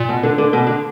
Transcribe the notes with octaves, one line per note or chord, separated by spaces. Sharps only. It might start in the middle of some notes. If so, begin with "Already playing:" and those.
Already playing: A#2
B2
D3
D3
B2
D3